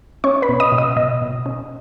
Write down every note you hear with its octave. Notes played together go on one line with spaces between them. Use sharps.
C#4 C#5 C#6
B4 B5
B2
D#5 D#6
B2
D#5 D#6
B2 D#5 D#6
B2
C#4